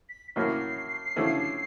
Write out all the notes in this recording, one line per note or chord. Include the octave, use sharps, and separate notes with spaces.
B6
A2 F#3 A#3 C#4 C7
D3 F3 A3 C#4 E4